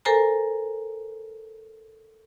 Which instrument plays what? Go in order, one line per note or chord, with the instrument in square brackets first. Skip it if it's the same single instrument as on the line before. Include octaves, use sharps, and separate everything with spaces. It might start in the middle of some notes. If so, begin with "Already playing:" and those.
[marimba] A4 A#4 C5 G#5 A#5